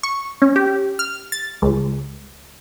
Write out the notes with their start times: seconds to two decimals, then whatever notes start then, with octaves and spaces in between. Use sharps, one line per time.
0.03 C#6
0.42 C#4
0.56 G4
0.99 F6
1.32 A6
1.62 C#2